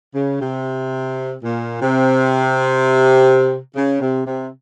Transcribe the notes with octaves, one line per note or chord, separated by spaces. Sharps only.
C#3
C3
A#2
C3
C#3
C3
C3